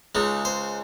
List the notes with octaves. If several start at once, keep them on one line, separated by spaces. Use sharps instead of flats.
C#2 C#3 G#3 D#4
C5